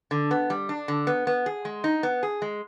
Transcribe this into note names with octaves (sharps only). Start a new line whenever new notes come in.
D3
B3
G3
D4
D3
B3
B3
G#4
G#3
D#4
B3
G#4
G#3